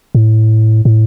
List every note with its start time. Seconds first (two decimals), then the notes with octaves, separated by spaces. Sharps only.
0.15 A2
0.85 A2